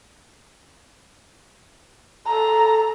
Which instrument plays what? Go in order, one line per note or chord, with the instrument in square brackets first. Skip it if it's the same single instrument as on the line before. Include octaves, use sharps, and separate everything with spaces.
[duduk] A4 [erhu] A#5